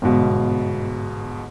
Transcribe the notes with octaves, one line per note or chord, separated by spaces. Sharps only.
G1 G#2 B2